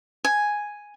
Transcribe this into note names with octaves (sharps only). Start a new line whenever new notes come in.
G#5